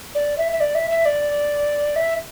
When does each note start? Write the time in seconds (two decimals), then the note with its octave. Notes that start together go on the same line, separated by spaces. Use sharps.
0.15 D5
0.38 E5
0.52 E5
0.60 D5
0.75 E5
0.91 E5
1.06 D5
1.96 E5